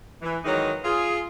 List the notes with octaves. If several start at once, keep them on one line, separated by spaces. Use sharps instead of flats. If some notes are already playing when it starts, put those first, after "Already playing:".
E3
D#3 E3 F#3 G#3 D#4
F4 G#4